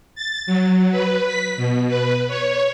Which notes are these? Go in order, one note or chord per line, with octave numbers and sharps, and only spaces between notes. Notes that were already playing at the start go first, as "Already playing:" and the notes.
A6
F#3
B4
B6
B2
B4
C#5